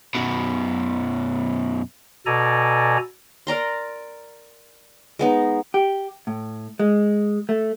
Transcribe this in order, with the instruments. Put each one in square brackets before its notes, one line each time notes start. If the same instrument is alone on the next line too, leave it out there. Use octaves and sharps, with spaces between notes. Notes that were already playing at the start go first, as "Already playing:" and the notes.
[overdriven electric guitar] F#2 B2
[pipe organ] B2 A4 D5 G#5 A#5
[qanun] A#4 D5 A#5 C6
G#3 B3 D#4
[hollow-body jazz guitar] G4
A2
G#3
A3